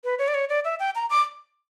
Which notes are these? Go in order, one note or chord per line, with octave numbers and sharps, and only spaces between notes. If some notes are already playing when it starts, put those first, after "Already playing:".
B4
C#5
D5
C#5
D5
E5
G5
A#5
D6